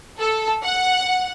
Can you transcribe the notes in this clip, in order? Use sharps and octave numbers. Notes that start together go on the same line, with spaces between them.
A4
F#5